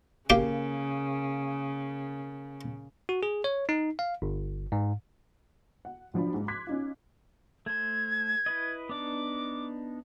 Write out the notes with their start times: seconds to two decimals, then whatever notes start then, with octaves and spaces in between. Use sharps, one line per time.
0.30 C#3 A#3 G4 F5 G5
3.09 F#4
3.23 G#4
3.44 C#5
3.69 D#4
3.99 F5
4.22 G1
4.72 G#2
5.85 F#5
6.14 B1 F3 D4 B5
6.34 G#2
6.48 C6 D6 F#6 G#6 B6
6.67 C#4 D#4 F4
7.66 A3 C5 G#6
8.46 E4 B4 D#5
8.89 B3 D4 D#4 D6